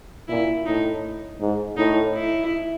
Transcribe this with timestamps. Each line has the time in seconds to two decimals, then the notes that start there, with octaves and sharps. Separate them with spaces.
0.28 A#2 E4
0.66 A2 D#4
1.41 G#2
1.77 A2 D#4
2.14 E4